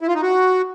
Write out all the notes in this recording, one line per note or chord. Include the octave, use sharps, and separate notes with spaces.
E4
F4
D#4
F#4